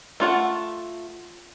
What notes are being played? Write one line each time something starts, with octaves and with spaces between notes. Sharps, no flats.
A3 F4 F#5